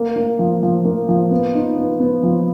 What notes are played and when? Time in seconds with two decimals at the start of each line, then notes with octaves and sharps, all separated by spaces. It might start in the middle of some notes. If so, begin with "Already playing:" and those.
Already playing: A#3
0.16 A#3
0.39 F3
0.63 F3
0.85 A#3
1.09 F3
1.31 B3
1.55 D#4
1.77 B3
2.00 B3
2.23 F3